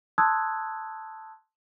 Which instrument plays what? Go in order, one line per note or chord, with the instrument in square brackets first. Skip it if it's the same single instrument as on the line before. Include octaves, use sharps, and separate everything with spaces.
[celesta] A5 C6 D#6 E6 F#6 G#6